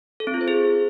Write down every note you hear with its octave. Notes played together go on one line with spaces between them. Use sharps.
A4
C4
F4
C5
G#4